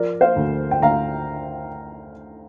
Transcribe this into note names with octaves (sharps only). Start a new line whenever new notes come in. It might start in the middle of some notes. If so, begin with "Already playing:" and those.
Already playing: F3 A#4 D5
C5 F5
D2
G5
D2 F5 A#5